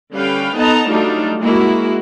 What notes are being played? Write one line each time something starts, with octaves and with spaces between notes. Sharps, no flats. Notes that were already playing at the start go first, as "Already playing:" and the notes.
D3 G3 C#4 B4 F5 G5
B3 D#4 A4 D#5 A5 A#5
F#3 G3 A3 D4 D#4 F4
G#3 A#3 E4 F#4